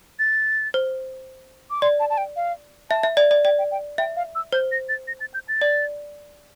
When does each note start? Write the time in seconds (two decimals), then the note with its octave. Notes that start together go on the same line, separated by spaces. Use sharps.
0.19 A6
0.74 C5
1.70 D6
1.82 D5 C6
2.00 A5
2.10 A5
2.18 G5
2.36 F5
2.90 E5 A5
3.03 E5
3.17 D5
3.31 D5
3.45 D5 G5
3.58 G5
3.71 G5
3.98 E5 G5
4.16 F5
4.35 E6
4.52 C5 G6
4.72 A#6
4.89 A6
5.07 A#6
5.20 A6
5.34 G6
5.48 A6
5.61 D5